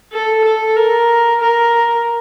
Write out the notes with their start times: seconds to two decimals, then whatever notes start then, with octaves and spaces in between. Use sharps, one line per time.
0.12 A4
0.45 A4
0.76 A#4
1.40 A#4